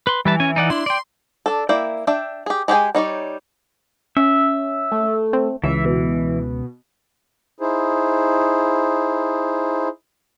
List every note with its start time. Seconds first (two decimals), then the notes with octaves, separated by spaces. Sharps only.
0.07 B4 C6
0.25 E3 G3 B4 A5
0.40 C#4 G#5
0.56 D#4 D5 F#5
0.70 D4 E4 C6
0.86 D5 G5
1.46 D4 A4
1.69 A#3 E4 D5 E5 G5
2.07 D4 E5 G5
2.46 G4 G#4
2.68 G#3 G4 G#4 G5 G#5
2.95 G3 D#4 C#5 D5
4.17 C#4 E5
4.92 A3
5.33 C4
5.64 C#2 E3 E5
5.85 B2
7.61 D#4 E4 G#4 C5